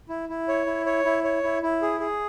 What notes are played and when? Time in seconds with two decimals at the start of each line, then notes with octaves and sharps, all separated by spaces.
0.09 E4
0.29 E4
0.48 C#5
0.66 E4
0.86 C#5
1.05 E4
1.24 C#5
1.43 E4
1.63 E4
1.82 G#4
2.00 G#4